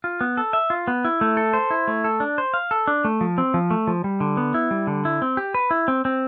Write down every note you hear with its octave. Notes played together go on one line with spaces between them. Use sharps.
F4
B3
A4
E5
F4
B3
E4
A3
A4
C5
E4
A3
A4
D4
C5
F5
A4
D4
A3
F3
C4
F3
A3
F3
G3
D3
B3
E4
G3
D3
E4
C4
G4
B4
E4
C4
C4